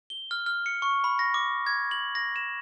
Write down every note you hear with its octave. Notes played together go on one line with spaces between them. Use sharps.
G7
F6
F6
C#7
C#6
B5
A#6
D6
G#6
F#7
A#6
E7